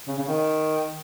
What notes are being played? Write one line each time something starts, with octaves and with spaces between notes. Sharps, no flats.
C#3
C#3
D#3